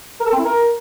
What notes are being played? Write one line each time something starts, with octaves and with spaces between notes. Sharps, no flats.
A#4
A4
C4
E4
A#4